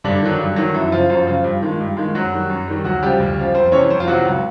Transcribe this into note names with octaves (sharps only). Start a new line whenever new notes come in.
G2 D3 D4
D#3 F#3
G2
D#3 F#3
F#2 E3 E4
C#3 F3 F4
F#2 F3 F4
C#3 F3
G2
D#3 G#3
G2
D#3 G#3
F#2 F#3 F#4
D#3 G3
F#2
D#3 G3
D2 F#3 F#4
C#3 F3 G3 G4
D2
C#3 F3
F2 C4 C5
C3 E3 C#4 C#5
F2 C4 C5
F4
C3 E3 F#3 F#4
C#2